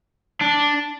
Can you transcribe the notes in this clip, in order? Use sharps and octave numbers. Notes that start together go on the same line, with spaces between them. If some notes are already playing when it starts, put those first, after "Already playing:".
D4